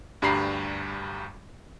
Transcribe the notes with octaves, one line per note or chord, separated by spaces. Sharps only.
D2 G2 G3 A#5 B5 C7